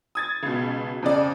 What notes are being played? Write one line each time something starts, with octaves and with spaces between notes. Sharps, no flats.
D#6 G#6 A6
C#2 B2
F2 C#3 D5